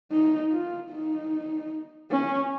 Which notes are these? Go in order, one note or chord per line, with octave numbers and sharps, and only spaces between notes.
D#4
F4
D#4
C#4